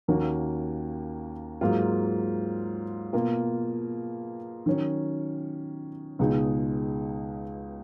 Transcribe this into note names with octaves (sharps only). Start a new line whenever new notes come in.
D#2 D#3 A#3 C#4 F#4
G#2 F#3 A#3 F4
B2 A#3 F4
D#3 F#3 C#4
C#2 B2 G#3 D#4